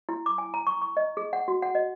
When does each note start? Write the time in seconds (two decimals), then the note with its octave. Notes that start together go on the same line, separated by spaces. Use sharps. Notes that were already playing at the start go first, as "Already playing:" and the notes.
0.09 E4
0.26 D6
0.38 G#5
0.54 A#5
0.67 C#6
0.82 C#6
0.97 D#5
1.17 G#4
1.33 F#5
1.48 F#4
1.62 F#5
1.75 D#5